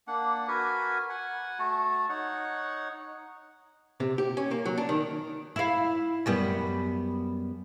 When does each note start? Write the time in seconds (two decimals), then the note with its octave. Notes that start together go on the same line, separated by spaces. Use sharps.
0.07 A#3 D4 F#5
0.48 F#4 A#4 B4 G#5
1.09 F#5 G#5
1.59 A3 F#4 A5
2.09 D#4 C#5 F#5
4.00 C3
4.18 G4
4.37 C#4
4.51 A#3
4.65 F#3
4.77 D4
4.89 D#3
5.56 E4 F5
6.26 F#2 G3 B3